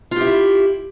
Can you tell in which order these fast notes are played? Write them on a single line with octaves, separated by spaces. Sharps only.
F4 G4 E4